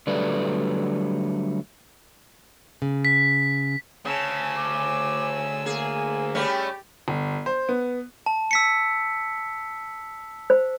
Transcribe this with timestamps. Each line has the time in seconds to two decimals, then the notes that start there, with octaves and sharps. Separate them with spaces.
0.07 D3 F#3 G3 A3 B4 D5
2.82 C#3
3.05 B6
4.05 D2 C#3 G#5 A5 E6
4.57 D6
5.66 A#3 G#4
6.35 G3 A3 C#4 G4
7.08 G1
7.46 C5
7.69 B3
8.26 A5
8.51 E6 B6 C#7
10.50 C5